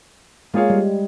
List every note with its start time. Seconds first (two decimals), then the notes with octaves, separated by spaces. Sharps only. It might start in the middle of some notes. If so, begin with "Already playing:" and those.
0.54 G#3 A#3 F4 G#4 C#5 F5
0.70 G3